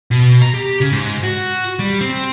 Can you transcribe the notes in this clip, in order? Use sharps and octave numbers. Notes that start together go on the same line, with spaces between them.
B2
A#5
G4
C#3
G#2
F#4
G3
C4